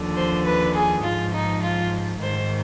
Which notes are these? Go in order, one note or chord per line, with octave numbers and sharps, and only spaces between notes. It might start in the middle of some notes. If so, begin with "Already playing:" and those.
Already playing: D#2 D3 F3
C5
B4
G#4
G#2 F3 F4
D#4
F4
G#2 D#3 C5